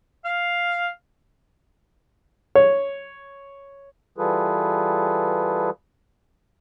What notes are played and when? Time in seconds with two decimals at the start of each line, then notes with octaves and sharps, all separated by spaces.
0.25 F5
2.55 C#5
4.18 E3 G3 F4 G#4 A4 B4